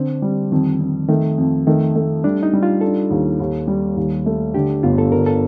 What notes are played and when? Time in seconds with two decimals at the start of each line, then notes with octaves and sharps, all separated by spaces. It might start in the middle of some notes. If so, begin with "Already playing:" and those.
Already playing: D3 C4 D4
0.22 G3
0.52 F2 D#3
0.81 F2
1.09 D#3 A3
1.38 F2
1.67 D#3 A3
1.96 A3
2.24 G3 D4
2.43 D#4
2.53 G3
2.63 F4
2.81 D4 A4
3.10 D#2
3.40 D#2
3.68 G3
3.96 D#2
4.26 A3
4.54 D3 G4
4.83 G1 F4
4.98 A4
5.12 D3 A#4
5.26 A4